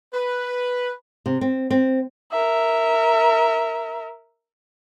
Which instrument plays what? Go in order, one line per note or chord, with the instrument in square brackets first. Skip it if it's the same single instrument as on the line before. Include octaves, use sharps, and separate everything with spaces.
[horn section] B4
[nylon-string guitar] C3
C4
C4
[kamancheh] A#4 E5